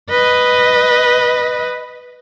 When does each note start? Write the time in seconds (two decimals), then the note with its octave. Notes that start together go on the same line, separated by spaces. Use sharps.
0.10 B4 D#5